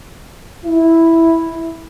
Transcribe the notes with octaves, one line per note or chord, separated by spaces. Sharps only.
E4